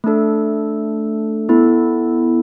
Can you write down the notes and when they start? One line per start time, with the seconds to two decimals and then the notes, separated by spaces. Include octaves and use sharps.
0.04 A3 D4 A4
1.49 B3 E4 A4